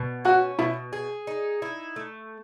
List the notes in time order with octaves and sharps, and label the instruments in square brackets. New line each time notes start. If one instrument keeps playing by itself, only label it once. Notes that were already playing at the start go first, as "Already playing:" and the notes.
Already playing: [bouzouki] B2
[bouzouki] C#4 [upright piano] F#4
[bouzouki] B2 [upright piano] E4
[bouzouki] G#4
D#4
E4
A3